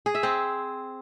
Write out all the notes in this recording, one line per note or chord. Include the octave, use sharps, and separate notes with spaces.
G#4
E5
C4